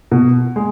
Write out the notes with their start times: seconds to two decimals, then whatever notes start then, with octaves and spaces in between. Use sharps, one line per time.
0.11 B2
0.56 G#3